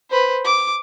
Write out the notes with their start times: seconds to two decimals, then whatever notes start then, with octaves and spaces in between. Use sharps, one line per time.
0.10 B4 C5
0.45 D6